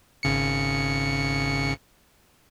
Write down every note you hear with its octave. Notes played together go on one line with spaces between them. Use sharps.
G#1 C#3 C#7